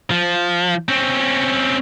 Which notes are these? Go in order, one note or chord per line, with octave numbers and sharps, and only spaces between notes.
F3
C4 C#4